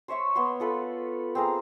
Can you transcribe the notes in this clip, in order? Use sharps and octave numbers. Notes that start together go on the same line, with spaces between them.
C5 C#5 E5 C#6
B3 C#5 C6
F4 A4 B4
C4 G#4 A#5